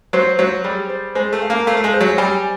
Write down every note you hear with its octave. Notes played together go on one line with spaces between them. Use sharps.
F#3 C5
F#3 C5
G3 G#4
C5
G#3 C5
A3
F5
A#3
A3 F5
A3
G#3
C5
F#3
G3 G#5